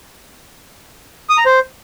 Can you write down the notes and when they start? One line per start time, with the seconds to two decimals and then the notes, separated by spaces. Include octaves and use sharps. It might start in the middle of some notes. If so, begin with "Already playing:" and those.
1.29 D#6
1.38 A#5
1.46 C5